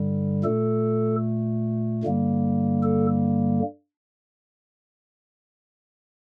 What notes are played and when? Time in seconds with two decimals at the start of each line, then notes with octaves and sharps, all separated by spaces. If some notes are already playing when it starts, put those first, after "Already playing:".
Already playing: G2 D3 G3
0.44 A#2 A3 A4
2.03 G2 D3 G3 A#3
2.83 A4